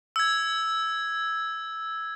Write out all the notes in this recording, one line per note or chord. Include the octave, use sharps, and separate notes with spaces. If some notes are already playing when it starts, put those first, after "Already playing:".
E6 G#6